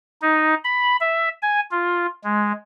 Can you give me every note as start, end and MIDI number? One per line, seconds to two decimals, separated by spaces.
0.22 0.54 63
0.64 0.97 83
1.01 1.29 76
1.42 1.60 80
1.71 2.07 65
2.24 2.52 56